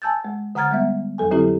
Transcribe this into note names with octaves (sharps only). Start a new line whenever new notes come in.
G#5 A5 E6 G6 A6
G#3
D3 F#5 A#5 F6 G#6 A6
G3 G#3 B3 E5
F2 F#3 A4 G#5
D3 F#3 C4 E4 G4 A4